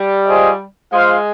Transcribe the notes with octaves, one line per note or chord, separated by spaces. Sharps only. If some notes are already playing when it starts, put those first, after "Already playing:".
Already playing: G3
F4 G#4 C5 D#5
G#3 F4 C5 F5